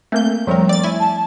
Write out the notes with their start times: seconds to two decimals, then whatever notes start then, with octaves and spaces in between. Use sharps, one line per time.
0.12 A3 A#3 C4 G6
0.47 F2 F3 G3 A3 C4 A#4
0.69 D5 A6
0.84 E4 G#5
1.00 A5